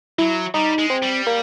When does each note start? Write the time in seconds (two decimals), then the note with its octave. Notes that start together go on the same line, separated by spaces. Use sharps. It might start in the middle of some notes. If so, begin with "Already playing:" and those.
0.18 F#3 E4
0.54 G3 D#4
0.78 G#3
0.90 C4
1.03 G3
1.27 A#3